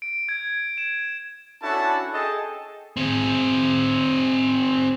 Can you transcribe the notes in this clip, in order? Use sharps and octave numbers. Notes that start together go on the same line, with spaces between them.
D7
G#6
E7
C#4 D4 E4 F#4 A4 A5
G#4 A4 D#5 G5 A5
C4 G#4